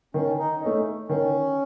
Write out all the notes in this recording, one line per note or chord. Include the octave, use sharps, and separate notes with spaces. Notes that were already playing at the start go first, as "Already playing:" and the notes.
D#3 C#4
D#4
A3 C#4 D#4
D#3 C#4